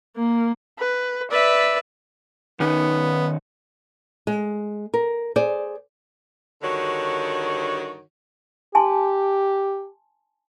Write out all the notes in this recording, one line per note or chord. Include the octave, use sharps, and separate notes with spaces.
A#3
B4
B4 D5 E5
D#3 B3 C#4 D#4
G#3
A#4
G#4 C5 D5
G2 D3 D#3 F#4 C#5
G4 G#5 A5 C6